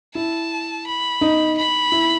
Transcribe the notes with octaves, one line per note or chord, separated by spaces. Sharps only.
E4 A5
B5
D#4
B5
E4